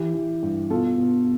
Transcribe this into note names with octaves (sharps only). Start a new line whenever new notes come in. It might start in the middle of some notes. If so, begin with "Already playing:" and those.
Already playing: E3 G4
E3
G2
B2 F4 A4
B2